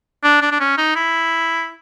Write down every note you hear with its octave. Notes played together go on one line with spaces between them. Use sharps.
D4
D4
D4
C#4
D#4
E4